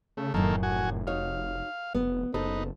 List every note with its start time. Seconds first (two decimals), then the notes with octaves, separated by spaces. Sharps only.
0.17 C#3 A3
0.34 F1 F#2 A2 D#3 A#3 A4
0.63 F#4 G#5
1.07 D#4 F#4 C#5 F5
1.94 F1 B3
2.34 F#1 D#4 A4 B4 C5